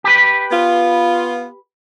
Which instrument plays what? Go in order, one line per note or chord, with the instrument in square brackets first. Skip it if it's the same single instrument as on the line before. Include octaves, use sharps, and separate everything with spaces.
[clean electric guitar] G4 B4
[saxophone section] B3 F4